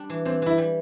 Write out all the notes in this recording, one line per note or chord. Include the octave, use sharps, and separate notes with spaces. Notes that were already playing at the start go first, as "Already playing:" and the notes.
Already playing: G3 D4
E3
E3 C4
E3 E4
G3